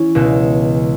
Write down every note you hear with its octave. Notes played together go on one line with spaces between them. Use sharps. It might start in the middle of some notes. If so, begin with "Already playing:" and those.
Already playing: E3 C#4
C#2 B2